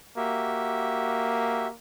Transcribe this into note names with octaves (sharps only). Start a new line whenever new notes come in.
A#3 F#4 G4 E5